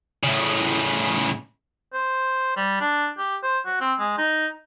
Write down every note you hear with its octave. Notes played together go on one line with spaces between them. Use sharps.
A2 C#3
C5
G3
D4
G4
C5
F#4
C4
G#3
D#4